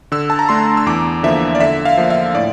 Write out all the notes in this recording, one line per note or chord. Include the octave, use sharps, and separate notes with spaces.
D3 E6
A5
A#5
A3 D4 C6
E6
E2 D6
D3 F3 A#3 E5
D5
D3 E5
F5
F3 A#3
F5
E5
A2 D5